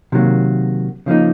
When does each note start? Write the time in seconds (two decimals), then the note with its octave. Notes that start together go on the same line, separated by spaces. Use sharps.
0.12 C3 D#3 F#3 A#3
1.06 C#3 F3 A#3 D#4